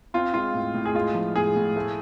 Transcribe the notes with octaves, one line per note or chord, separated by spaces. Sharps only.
C4 F4
G#3 F4
A2
A2
G#4
G#3 F4
F3
A2 G#4
A2
A3